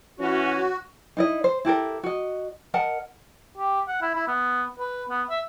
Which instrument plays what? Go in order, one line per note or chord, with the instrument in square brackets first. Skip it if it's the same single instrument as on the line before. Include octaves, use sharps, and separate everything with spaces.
[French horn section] E3 C#4 [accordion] F#4
[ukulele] D#4 E4 D#5
C5
E4 G4 A4 A#4
F#4 D#5
A#4 D#5 F#5 A5
[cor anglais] G4
F#5
E4
E4
B3
B4
B3
E5